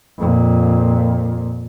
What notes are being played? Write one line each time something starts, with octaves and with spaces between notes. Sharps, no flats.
F2 A#2